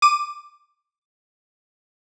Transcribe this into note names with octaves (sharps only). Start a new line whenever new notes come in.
D6 D#7